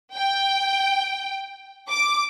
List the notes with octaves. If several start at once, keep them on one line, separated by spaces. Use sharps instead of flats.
G5
D6